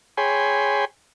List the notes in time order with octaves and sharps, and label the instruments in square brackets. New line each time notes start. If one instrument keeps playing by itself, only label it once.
[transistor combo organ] G#4 C#5 G5 G#5 B5 C6